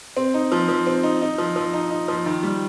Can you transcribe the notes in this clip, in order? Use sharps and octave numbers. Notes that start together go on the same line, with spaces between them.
C4
D#4
F3
F3
C4
D#4
D#4
F3
F3
D#4
D#4
F3
D#3
G3